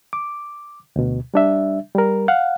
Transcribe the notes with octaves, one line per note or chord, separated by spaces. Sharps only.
D6
D2 B2
G3 D4 E5
G3 A#4
F5 F#5